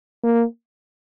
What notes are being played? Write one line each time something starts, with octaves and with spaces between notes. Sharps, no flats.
A#3